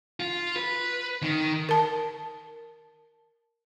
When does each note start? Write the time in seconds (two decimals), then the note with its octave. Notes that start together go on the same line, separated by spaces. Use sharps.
0.20 F4
0.56 B4
1.23 D#3
1.69 A#4 A5